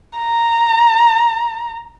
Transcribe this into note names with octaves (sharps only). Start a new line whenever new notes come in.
A#5